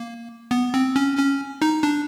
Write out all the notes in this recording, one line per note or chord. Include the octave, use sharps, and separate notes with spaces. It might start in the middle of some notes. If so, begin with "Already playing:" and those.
Already playing: A#3
B3
C4
C#4
C#4
D#4
D4